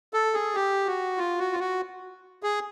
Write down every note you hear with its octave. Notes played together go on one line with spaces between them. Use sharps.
A4
G#4
G4
F#4
F4
F#4
F4
F#4
G#4